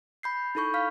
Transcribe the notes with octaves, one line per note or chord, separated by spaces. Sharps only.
B5 G6 C7
D#4 E4 A4 B5 C#6 G6
F5 F6 B6